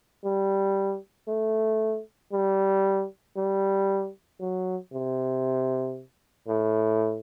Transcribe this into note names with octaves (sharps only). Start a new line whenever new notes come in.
G3
A3
G3
G3
F#3
C3
A2